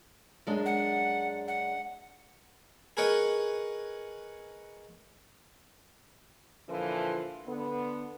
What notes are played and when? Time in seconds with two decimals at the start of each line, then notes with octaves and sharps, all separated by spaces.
0.47 F#2 G#3 D4
0.66 F#5
1.48 F#5
2.97 G#4 A#4 B4 C#5 D#5 F#5
6.68 A#2 D3 E3 F3
7.46 D3 B3